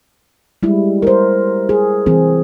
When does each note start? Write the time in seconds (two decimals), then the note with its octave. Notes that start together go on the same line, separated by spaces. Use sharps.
0.63 G3 G#3 E4
1.02 A#4 C5
1.69 G#4
2.06 E3 C4 G#4